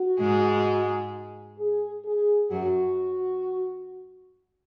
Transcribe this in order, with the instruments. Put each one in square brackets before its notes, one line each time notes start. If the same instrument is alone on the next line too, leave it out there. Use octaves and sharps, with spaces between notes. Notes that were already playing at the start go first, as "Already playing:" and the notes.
Already playing: [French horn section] F#4
[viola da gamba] G#2 G#3
[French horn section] G#4
G#4
[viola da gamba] F#2 F#3 [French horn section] F#4